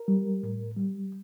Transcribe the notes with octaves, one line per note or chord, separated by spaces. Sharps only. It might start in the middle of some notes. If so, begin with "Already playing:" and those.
Already playing: A#4
G3
A2
G3